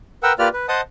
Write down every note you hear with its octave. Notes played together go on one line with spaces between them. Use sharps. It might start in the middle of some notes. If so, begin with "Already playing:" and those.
A#4 B4 F#5 G5 E6
A#3 F4 G4 B4 D5 F6
B4
C5 D#5 F#5 A5 D#6